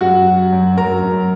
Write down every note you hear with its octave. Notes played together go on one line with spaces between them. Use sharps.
F#2 F#4 F#5
F#3
F#2
F#2 A#4 A#5
F#2